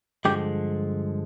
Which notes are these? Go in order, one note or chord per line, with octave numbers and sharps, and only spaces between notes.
G2 D3 F3 G#3 G4